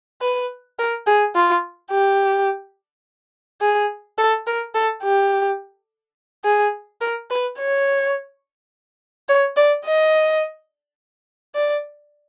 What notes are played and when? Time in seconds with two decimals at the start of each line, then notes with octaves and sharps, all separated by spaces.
0.21 B4
0.79 A#4
1.07 G#4
1.35 F4
1.91 G4
3.61 G#4
4.18 A4
4.47 A#4
4.75 A4
5.03 G4
6.45 G#4
7.01 A#4
7.30 B4
7.58 C#5
9.29 C#5
9.57 D5
9.85 D#5
11.55 D5